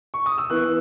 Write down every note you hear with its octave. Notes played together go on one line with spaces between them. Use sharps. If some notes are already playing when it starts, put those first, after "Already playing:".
C#6
D#6
E6
E3 B3 E4 F#6